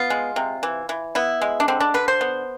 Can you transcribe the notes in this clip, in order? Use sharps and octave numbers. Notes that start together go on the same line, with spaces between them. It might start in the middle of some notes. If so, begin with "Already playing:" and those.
Already playing: B3 F4
G#3
C3
E3
E3
B3 E4
G#3
D4
D3 C4
D4
D3 B4
C5
B3